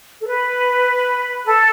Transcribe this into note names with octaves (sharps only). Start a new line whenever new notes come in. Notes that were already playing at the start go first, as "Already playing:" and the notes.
A4
B4
A4